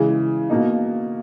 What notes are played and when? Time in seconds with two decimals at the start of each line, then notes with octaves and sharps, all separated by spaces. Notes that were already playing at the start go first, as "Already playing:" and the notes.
Already playing: C#3 E3 G#3
0.50 B2 A#3 D#4